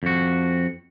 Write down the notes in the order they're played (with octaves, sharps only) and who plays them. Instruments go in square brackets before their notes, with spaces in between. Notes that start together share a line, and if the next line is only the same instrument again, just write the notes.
[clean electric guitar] F2 F#4